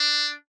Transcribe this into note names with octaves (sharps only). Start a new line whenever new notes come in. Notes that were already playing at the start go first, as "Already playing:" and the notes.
Already playing: D4